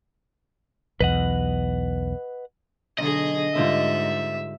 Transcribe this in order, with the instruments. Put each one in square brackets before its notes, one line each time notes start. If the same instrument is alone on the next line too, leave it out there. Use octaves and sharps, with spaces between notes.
[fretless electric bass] B1 E2 [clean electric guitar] B4 D#5 F#5
[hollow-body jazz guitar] B1 [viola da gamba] D3 G#4 [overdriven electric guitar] D#5
[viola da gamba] G#2 [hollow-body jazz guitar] D3 G3 F4 [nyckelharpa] E5